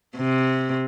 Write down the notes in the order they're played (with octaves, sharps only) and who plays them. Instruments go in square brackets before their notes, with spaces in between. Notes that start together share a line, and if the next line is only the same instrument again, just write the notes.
[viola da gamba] C3